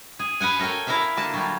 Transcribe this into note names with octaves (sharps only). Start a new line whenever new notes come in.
G#4
B4 F5 F#5 G#5
A4 A#4 C#5 G5 G#5
E4 A#4 D5 E5 F5
D3 A#3 D4 A5
F#3 G3 F4